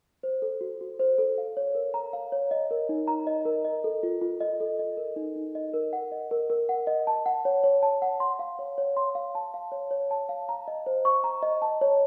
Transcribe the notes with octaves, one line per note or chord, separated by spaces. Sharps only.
C5
A4
F#4
F#4
C5
A4
F5
C#5
A#4
A#5
F5
C#5
D#5
A#4
D#4
A#5
D#5
A#4
D#5
A4
F4
F4
D#5
A4
D#5
A#4
D#4
D#4
D#5
A#4
F#5
D#5
A#4
A#4
F#5
D#5
A5
F#5
C#5
C#5
A5
F#5
C6
F5
C#5
C#5
C6
F5
A5
F5
C#5
C#5
A5
F5
A#5
D#5
C5
C#6
A#5
D#5
A5
C#5